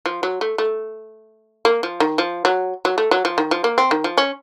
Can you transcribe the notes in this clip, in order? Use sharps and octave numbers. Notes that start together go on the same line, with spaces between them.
F3
F#3
A3
A3
A#3
F3
D#3
F3
F#3
F#3
A3
F#3
F3
D#3
F3
A#3
C4
D#3
F3
C#4